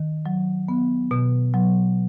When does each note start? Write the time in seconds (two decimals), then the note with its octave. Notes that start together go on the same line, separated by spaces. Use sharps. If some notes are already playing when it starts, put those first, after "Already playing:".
Already playing: D#3
0.26 F#3
0.68 B3
1.11 B2
1.54 F#3